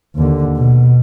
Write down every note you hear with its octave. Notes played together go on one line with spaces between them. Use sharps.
D#2 D3
B2